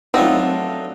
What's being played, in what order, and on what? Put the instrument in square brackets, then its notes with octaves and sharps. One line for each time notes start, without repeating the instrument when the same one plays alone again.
[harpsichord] F#3 A3 D4 [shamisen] C4 [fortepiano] D#4 F4 [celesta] F#5